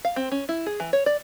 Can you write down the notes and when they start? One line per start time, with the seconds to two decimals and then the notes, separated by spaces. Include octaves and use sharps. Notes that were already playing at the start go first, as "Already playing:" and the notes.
0.05 F5
0.16 C4
0.32 C#4
0.49 E4
0.66 G#4
0.80 E3
0.93 C#5
1.06 D5